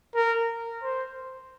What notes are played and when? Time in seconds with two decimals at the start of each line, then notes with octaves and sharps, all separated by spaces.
0.15 A#4
0.83 C5